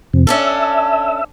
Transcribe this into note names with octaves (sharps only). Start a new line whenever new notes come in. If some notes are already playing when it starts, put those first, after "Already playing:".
F2 C3
C#4 D4 A4 E5